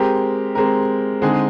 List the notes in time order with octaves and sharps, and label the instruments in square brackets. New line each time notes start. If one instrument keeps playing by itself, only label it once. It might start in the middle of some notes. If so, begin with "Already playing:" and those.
Already playing: [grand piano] G#3 C4 G4 A#4
G#3 C4 G4 A#4
D3 G#3 C4 D#4 G#4